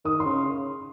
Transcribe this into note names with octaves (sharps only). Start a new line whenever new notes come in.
D#3 D#6
C6
C#3